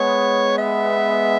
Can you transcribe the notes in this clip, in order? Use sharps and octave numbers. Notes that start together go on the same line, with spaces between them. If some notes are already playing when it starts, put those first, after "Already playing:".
Already playing: G#3 B3 C#5
E5